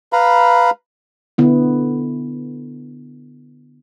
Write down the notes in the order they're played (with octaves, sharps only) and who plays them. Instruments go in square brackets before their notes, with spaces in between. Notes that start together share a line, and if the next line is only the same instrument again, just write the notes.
[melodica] B4 F5 A#5 B5
[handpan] D3 B3 E4